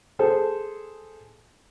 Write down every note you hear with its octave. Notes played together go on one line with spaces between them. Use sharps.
G#4 A4 C5